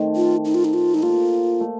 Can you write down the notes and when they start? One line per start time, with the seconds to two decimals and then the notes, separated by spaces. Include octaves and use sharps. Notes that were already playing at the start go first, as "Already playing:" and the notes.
Already playing: D#3 A3 C4
0.16 F4
0.45 D#4
0.55 F4
0.64 D#4
0.74 F4
0.94 A3 D#4
1.03 A#3 F4
1.60 A3